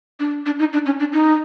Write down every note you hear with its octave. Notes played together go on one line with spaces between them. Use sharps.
D4
D4
D#4
D4
C#4
D4
D#4